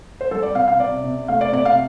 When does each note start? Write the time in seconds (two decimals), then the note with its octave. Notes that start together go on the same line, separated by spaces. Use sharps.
0.21 C5
0.31 G3 A4
0.43 D5
0.55 C3 F5
0.68 F5
0.79 C3 D5
1.04 C3
1.28 A3 F5
1.41 D5
1.52 C3 D5
1.65 F5